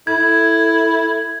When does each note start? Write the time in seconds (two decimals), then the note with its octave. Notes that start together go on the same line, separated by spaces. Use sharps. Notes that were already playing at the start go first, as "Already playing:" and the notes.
0.07 E4 A4 G#6